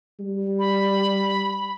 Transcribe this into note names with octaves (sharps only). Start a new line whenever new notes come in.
G3
B5